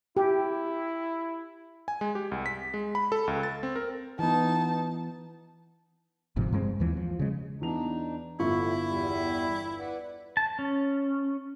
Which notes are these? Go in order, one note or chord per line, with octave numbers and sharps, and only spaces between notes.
E4 G4
G#5
G#3
G4
C2
B6
G#3
B5
A4
C#2
A6
C4
A#4
E3 B3 D#4 A5
G1 G#2 C3 F3
G2 G#3 C4
D#2 E3 F3
F3
C#3 G#3
E2 D4 D#4 F7
G1 A2 D3 E4 F4 C#6
E2 G3
B4 D5 F#5
A5
C#4